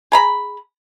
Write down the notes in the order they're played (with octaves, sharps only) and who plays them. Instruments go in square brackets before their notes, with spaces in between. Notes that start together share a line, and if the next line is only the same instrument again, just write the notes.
[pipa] G#4 A#5 B5